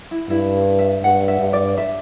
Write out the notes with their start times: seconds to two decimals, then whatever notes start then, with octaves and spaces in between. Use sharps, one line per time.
0.11 E4
0.30 G2 E4
0.79 E5
1.03 G2 F#5
1.28 E5
1.40 G2
1.53 D5
1.78 E5